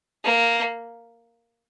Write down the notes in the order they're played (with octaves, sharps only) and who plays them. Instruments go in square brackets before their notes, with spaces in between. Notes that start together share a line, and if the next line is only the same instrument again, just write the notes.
[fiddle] A#3